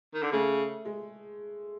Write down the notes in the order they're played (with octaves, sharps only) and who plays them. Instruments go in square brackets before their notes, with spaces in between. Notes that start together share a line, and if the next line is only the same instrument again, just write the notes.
[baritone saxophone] D#3
D3
[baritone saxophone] C#3 [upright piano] A3
[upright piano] G#3